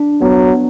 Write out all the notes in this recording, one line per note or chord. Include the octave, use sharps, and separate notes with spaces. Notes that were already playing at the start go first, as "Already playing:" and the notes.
Already playing: D4
F#3 B3